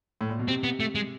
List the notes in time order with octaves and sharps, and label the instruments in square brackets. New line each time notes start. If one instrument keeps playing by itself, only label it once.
[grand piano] A2
A#2
B2
[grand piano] C3 [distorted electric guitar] C4
[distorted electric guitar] B3
A3
G#3